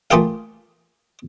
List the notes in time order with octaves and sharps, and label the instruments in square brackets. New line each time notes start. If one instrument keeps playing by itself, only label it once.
[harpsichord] A3 A#3 F4 G4 G#4 F5